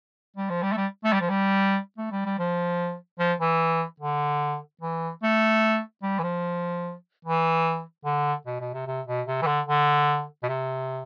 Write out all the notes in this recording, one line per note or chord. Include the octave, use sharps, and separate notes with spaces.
G3
F3
G3
A3
G3
A3
G3
F3
G3
A3
G3
G3
F3
F3
E3
D3
E3
A3
G3
E3
F3
E3
D3
B2
B2
C3
C3
B2
C3
E3
D3
D3
B2
C3